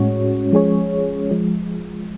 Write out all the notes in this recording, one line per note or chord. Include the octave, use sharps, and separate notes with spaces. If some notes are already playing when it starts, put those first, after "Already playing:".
Already playing: A2 G#3 C#4 F#4 C#5
F3 G#3 C#4 G#4 C#5
F3 G#3